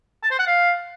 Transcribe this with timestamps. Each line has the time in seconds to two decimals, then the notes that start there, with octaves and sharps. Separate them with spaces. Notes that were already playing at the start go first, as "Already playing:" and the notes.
0.23 A5
0.31 C5
0.39 F#5
0.47 F5